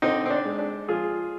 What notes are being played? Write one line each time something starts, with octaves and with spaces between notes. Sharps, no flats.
D3 C4 D#4
C4
D4
G#3
D4
F3 F4 G#4